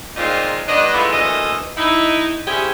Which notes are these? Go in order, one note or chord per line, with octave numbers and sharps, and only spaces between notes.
A#2 G#3 C4 D#4 F4
G2 B3 D4 D5 D#5
E3 G#3 A3 B3 E4 F4
D2 A#2 E3 A4 D#5
D#4 E4
C4 C#4 E4 G4 G#4